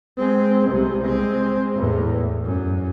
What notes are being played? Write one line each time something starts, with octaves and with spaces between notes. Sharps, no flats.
G#3 C4
C2 C3
G#3 C4
E2 A2
F#2